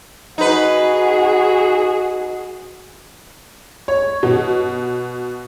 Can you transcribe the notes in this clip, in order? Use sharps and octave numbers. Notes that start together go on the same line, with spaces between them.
D#4 F#4 G#4 B4
C#5
B2